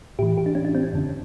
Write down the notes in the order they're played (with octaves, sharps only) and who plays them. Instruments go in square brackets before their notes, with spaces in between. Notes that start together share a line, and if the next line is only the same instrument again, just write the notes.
[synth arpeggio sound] A2 E3 G4
G4
D4
C#4
D4
C4
C#4
F#2 D3